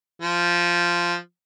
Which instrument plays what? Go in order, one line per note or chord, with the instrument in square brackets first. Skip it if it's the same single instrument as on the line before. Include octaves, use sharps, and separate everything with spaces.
[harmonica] F3